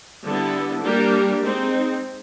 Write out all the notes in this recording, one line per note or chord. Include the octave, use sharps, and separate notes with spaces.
D3 G3 B3 E4 A4
G3 A#3 D4 G4 A#4
G#3 C4 D#4